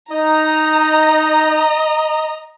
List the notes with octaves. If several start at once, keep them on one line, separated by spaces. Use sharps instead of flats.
D#4 D#5 A#5